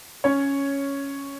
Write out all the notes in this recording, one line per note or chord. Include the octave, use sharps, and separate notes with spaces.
C#4 C#5